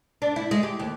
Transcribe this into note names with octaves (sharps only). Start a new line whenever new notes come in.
D4
E4
G#3
G4
D#2